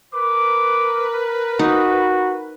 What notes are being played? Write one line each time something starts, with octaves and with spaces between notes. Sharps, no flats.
A#4 B4 D6
D#4 F#4